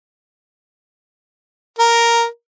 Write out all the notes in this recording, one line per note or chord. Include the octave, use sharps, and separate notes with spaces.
A#4